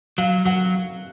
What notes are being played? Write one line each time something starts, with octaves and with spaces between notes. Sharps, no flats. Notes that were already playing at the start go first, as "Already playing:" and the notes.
F#3 F5
F#3 F#5